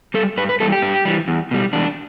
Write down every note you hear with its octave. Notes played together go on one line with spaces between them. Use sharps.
G3 A4
G2 B4
B4
E3 G3 A4
G4
G2
E3 G3
E2
B2 G3
E2 D4